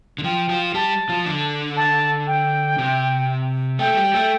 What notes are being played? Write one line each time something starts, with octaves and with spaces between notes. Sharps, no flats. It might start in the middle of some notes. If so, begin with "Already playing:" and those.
D3
F3 G5
F3 F4
G3 G4 A5
F3 F4
D3 D4
A5
G5
C3 C4
A3 A4 G5
A4
G3 G4
A3 A4